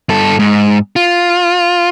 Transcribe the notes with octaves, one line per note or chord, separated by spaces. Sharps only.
G2 A4
G#2
F4